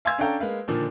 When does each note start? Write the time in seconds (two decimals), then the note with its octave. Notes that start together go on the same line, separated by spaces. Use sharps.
0.05 F5 G#5 C6 E6 G#6
0.18 C#4 D4 A4 F5 G5 A#5
0.40 G#3 A#3 B4 F5
0.68 A#2 D3 D#3 F3